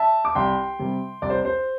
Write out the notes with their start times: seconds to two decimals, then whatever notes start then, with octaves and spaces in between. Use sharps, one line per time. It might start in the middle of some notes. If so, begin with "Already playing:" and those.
Already playing: E5 A5
0.25 D6
0.35 C2 G5 C6
0.79 C3 G3
1.22 C2 D5
1.30 C5
1.45 C5